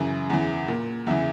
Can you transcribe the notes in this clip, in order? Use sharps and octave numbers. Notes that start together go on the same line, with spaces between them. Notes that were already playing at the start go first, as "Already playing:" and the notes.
Already playing: F#2 C#3 E3
E2 C#3 E3
A#2
E2 C#3 E3 E5